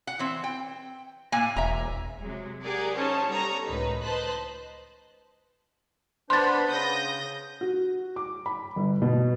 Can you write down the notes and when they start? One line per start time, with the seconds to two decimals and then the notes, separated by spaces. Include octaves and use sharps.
0.07 F#5
0.19 E3 C4
0.44 G5
1.32 A2 A#3 G#5
1.57 E1 E5 A#5
2.21 C3 F#3 G#3
2.63 G4 G#4 A#4 D5 F#5
2.96 C#4 D#4 C5 C#5 A5
3.29 G3 B3 A4 C#5 A#5 D#6
3.66 C#2 A2 D#3 D#4 B4
4.03 B4 C5 D#5 A5 F#6
6.30 B3 D4 C5 B5 C6 A6
6.70 C#3 D#6 G6 A#6
7.61 F#4
8.16 D6
8.46 B5
8.76 G1
9.02 B2